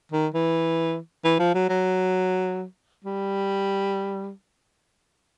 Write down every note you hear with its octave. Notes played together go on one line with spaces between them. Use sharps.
D#3
E3
E3
F3
F#3
F#3
G3